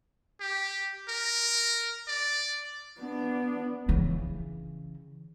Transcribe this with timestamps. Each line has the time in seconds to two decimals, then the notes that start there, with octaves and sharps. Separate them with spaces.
0.40 G4
1.09 A#4
2.08 D5
3.00 B3 D4
3.88 C#3 E3